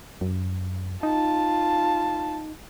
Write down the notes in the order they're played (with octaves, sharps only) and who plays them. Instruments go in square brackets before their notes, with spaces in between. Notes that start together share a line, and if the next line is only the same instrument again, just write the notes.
[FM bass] F#2
[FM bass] D#4 [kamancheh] F4 A5